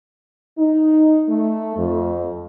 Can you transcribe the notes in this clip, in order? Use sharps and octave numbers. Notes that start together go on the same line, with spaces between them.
D#4
A3
F2